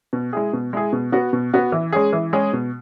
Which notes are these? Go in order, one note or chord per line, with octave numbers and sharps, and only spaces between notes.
B2
G#3 E4 G#4
B2
G#3 E4 G#4
B2
B3 F#4
B2
B3 F#4
E3
G#3 C#4 G#4
E3
G#3 C#4 G#4
B2